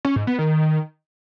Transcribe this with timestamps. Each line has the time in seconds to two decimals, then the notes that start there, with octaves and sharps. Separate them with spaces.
0.05 C#4
0.16 G#2
0.27 B3
0.39 D#3